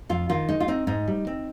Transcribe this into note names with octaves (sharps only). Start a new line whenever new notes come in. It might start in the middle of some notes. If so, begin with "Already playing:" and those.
F2 F4
D#3 F4
G#3 D#4
F4
C4 D#4
G#2 D#4
G3
C4